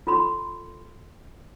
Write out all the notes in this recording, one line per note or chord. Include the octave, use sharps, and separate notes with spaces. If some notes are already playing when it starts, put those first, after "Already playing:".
F4 A4 B5 C6